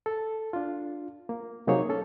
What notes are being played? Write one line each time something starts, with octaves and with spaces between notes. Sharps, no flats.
A4
D4 F4
A#3
C3 F#3 A#3 D#4 G#4 C#5
C#4 A4